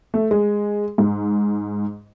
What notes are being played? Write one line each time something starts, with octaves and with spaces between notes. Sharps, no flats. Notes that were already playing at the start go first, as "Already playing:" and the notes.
A3
G#3
G#2